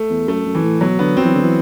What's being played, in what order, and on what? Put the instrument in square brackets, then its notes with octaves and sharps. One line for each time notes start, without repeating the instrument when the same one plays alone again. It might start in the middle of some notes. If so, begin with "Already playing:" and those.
Already playing: [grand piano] A3
[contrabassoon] E2
[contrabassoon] F#2 [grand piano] A3
[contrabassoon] F#2
[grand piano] E3
[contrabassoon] A2
[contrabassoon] B2 [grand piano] F#3
[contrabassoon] D3 [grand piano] B3
[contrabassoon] F#3 [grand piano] C4
[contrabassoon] E3
D3
E3